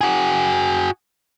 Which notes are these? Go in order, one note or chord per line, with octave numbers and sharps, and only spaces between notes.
F#4 G#4